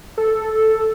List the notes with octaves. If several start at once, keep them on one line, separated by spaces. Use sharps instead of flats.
A4